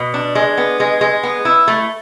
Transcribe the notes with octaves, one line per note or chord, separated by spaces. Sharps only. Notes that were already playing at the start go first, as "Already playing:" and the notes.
Already playing: B2
D4
G#3
B3
G#3
G#3
B3
E4
A3